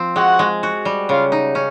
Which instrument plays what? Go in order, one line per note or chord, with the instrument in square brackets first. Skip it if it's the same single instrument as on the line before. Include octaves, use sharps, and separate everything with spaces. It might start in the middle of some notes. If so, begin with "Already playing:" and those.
Already playing: [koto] F3 C4
[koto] G#3 [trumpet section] F#4 F#5
[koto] G#3
F#4
G3
[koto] C#3 [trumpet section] F4 F5
[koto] D#4
C#4